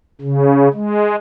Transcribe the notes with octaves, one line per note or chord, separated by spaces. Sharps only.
C#3
G#3